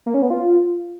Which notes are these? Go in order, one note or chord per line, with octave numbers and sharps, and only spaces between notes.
A#3
C#4
B3
F4